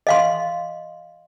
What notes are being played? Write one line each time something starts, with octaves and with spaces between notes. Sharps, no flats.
D#5 F5 C6